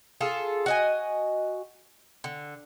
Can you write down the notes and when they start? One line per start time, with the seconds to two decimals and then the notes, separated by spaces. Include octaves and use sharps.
0.21 F4 G#4 A4
0.66 F#4 D#5 G#5
2.24 D3